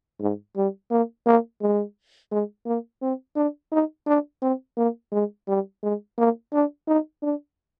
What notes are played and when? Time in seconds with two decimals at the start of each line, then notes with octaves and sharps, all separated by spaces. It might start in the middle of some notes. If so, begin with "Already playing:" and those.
0.21 G#2
0.56 G3
0.91 A#3
1.27 A#3
1.61 G#3
2.31 G#3
2.66 A#3
3.02 C4
3.36 D4
3.72 D#4
4.07 D4
4.42 C4
4.77 A#3
5.12 G#3
5.48 G3
5.83 G#3
6.18 A#3
6.53 D4
6.88 D#4
7.23 D4